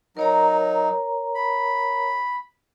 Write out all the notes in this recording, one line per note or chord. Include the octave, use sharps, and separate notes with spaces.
F#3 D#4 A#4 C#5 A#5
B5